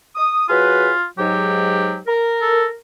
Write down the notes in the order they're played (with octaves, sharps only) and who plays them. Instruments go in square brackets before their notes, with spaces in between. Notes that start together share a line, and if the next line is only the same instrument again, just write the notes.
[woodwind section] D#6
[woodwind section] F#3 G#4 B4 [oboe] F4
[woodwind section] G#2 F#3 [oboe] G4
[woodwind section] A#4
[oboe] A4